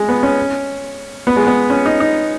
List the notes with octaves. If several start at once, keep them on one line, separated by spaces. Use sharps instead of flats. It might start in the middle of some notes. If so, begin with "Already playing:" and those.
Already playing: G#3
B3
C#4
B3
G#3
B3
C#4
D#4
D#4